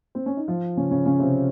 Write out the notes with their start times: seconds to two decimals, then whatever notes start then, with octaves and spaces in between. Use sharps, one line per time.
0.15 C4
0.26 C#4
0.37 D#4
0.48 F3 F4
0.77 C#3 C#4
0.91 C#3 C#4
1.06 C#3 C#4
1.19 C3 C4